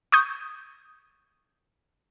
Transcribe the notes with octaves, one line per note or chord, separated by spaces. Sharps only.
C#6 D#6 G6